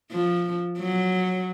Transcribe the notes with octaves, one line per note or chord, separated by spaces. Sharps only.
F3
F#3